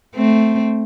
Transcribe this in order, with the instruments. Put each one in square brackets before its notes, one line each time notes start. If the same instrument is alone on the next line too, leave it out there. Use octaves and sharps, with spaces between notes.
[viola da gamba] A3 C4